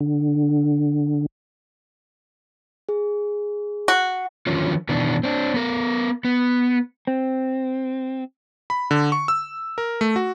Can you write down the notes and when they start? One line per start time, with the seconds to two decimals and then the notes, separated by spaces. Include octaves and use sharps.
0.01 D3
2.89 G#4
3.88 F#4 F#5
4.47 D3 D#3 F3 F#3 C#4 F4
4.89 B2 D#3 E3 D4
5.23 C4 D4
5.54 B3 A#4
6.25 B3
7.07 C4
8.70 B5
8.91 D3
9.12 C#6
9.28 E6
9.78 A#4
10.01 A3
10.16 F#4